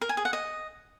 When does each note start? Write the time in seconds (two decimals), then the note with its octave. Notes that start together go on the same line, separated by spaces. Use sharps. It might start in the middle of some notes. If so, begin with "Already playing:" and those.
0.01 A#4
0.09 G#5
0.17 G#4
0.25 F#5
0.33 D#5